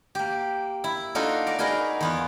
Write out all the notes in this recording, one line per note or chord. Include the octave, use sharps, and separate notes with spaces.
A#3 G4
E4
A#3 D4 D#4 F4 F#4 A4
A#4 D5
D#4 F#4 G#4 A#4 B4 D5
E2 B3 F4